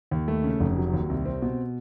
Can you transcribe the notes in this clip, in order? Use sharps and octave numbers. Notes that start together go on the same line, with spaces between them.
D#2
A3
C#3
F1
F#3
D#2
C2
C4
B2